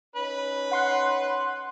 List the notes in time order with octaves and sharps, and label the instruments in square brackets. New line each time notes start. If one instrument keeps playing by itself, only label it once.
[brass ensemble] C#4 D#4 C#5 [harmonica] B4
[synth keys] F#5 C6 F#6